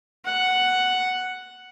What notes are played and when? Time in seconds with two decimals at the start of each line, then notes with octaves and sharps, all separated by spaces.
0.25 F#5